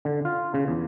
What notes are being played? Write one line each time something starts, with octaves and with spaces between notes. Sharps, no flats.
D3
F4
C#3
E2